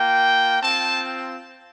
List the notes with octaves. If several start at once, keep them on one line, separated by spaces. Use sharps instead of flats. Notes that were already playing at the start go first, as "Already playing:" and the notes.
Already playing: A#3 F4 G5
C4 F4 A5